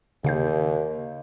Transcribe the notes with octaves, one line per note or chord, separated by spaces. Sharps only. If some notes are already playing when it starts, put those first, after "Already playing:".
D#2 C#3 F5 G6